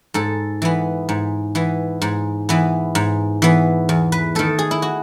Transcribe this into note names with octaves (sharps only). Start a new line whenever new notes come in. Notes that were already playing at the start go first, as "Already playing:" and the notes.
G#2 A4
E3 B3
G#2
E3 B3
G#2
E3 B3
G#2
E3 B3
E2
B4
D#3 A3 A4
G#4
E4
F#4